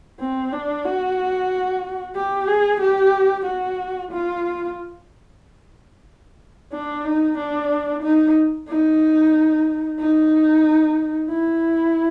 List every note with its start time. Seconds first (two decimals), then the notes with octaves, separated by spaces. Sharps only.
0.20 C4
0.53 D4
0.85 F#4
2.16 G4
2.48 G#4
2.81 G4
3.46 F#4
4.12 F4
6.73 D4
7.05 D#4
7.38 D4
8.03 D#4
8.69 D#4
9.99 D#4
11.30 E4